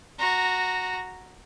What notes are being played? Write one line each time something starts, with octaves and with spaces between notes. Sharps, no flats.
F#4 A#5